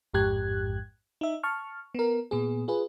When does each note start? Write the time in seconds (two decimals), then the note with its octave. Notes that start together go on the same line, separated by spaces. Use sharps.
0.14 A1 F2 G#2 G4 F#6 G#6
1.21 D#4 E5
1.43 A5 C#6 F6
1.95 B3 A#4
2.31 A#2 B3 G#4
2.68 F4 G#4 B4